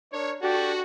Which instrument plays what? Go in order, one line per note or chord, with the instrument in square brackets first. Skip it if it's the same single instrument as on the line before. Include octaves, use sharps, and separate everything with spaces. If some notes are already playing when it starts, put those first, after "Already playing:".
[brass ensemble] D4 A#4 C#5
[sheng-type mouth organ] D4 G4 A4 [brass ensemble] F#4